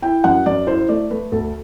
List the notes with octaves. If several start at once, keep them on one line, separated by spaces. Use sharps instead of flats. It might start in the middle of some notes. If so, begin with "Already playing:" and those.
E4 G5
F#2 F#5
F#2 D5
E4 C5
A3 D5
A3 B4
D2 A4